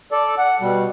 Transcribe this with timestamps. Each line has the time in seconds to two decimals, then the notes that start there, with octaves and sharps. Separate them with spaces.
0.12 A4 D5
0.38 F#5
0.61 B2 G3